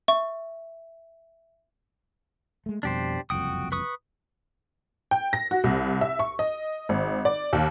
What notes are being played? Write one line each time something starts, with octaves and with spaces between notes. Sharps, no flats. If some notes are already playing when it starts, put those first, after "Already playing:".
E5 C#6
G#3 A3
F2 B2 G3 D4 G4 C5
F#1 C2 F2 F#4 G5 D#6
B4 C#6 D#6
G5
A#6
F#4
C2
E5
C#6
D#5
G#1
D5
D#2